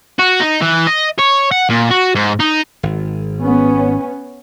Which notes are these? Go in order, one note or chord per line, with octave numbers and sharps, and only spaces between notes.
F#4
D#4
E3
D#5
C#5
F#5
A#2
F#4
G#2
D#4
G#1
B3 C#4